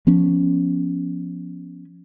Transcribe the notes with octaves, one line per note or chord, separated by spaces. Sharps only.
F3 B3 C#4